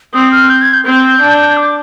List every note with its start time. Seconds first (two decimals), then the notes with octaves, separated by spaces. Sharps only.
0.14 C4 D#6
0.32 F6
0.50 G6
0.62 G#6
0.74 G6
0.85 C4 G6
1.21 D4
1.57 D6